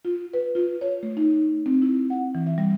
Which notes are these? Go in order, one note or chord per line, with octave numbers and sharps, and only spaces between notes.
F4
B4
F4
C#5
A3
D#4
C4
E4
F#5
E3
E5
G3